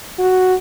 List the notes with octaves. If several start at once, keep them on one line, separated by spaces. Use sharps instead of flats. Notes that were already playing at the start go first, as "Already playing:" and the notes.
F#4